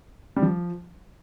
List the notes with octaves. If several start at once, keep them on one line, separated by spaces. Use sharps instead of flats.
G3
F3